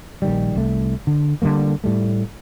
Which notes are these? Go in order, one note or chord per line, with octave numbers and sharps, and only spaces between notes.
A#1 D#3 G3
C2 A3
D3
D3 F#3 G3 A#3
A2 G3 A3